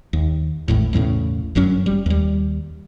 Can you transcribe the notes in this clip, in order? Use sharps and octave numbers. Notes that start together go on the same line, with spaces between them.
D#2
G#1 E2 A2
B1 E2 A2 C#3
G1 F#2 F#3 C#4
G3
D#2 G3